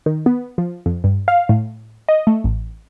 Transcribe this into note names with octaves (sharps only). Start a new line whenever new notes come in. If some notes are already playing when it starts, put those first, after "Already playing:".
D#3
B3
F3
F2
G2
F5
A2
D#5
A3
A1